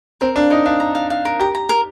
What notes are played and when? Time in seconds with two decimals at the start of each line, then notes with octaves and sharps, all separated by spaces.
0.21 C4 A#4
0.36 D4 F5
0.50 D#4 A#4
0.65 D4 F5
0.80 A#5
0.95 F5
1.10 F5
1.25 A#4
1.39 G4 A#5
1.55 A#5
1.69 A#4